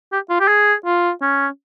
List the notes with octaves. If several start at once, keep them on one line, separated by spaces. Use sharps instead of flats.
G4
F4
G4
G#4
F4
C#4